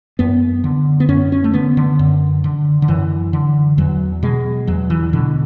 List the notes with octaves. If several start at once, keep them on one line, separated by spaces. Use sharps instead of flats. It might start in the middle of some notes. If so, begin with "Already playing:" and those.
F#2 B3
D3
B3
F#2 C#4
C#4
A3
D3 B3
D3
F#2
D3
D3
F#2 E3
D3
E2 F#3
B2 G#3
E2 F#3
E3
B2 D3